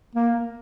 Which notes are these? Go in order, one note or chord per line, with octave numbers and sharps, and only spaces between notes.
A#3